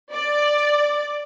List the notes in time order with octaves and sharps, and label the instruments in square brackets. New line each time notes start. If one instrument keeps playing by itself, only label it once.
[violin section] D5